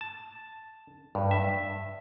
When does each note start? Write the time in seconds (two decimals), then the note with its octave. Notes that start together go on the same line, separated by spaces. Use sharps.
0.01 A5
1.15 G2
1.31 E5